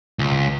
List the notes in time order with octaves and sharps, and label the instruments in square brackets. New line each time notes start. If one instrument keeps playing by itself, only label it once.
[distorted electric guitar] C#2